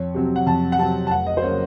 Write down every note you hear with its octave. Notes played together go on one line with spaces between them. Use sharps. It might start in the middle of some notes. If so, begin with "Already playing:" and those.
Already playing: F2 C#5
C3 F#3 C4
F#5
F2 A5
F#5
C3 F#3 C4 A5
A5
F1 F#5
D#5
C5
C#3 F#3 A#3 C#5